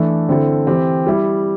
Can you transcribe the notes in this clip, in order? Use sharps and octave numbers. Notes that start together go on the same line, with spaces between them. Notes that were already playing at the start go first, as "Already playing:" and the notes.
Already playing: E3 A3 D4 A4
D3 C4 E4 A4
E3 C4 G4
G3 E4 G4